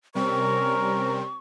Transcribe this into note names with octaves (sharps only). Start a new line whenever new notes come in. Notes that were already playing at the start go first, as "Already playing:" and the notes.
C3 G3 C4 C#4 A#4 C#6